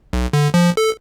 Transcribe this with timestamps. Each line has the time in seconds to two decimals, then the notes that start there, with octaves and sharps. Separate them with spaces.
0.13 B1
0.33 D3
0.54 F3
0.77 A4